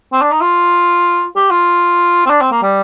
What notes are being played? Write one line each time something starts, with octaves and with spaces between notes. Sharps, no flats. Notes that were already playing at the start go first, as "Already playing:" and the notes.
C4
D4
D#4
F4
G4
F4
C4
D4
C4
A#3
G3